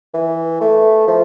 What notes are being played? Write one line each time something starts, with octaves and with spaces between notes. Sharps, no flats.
E3
A3
F3